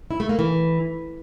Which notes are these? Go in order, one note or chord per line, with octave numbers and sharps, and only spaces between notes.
E4
A3
A#3
E3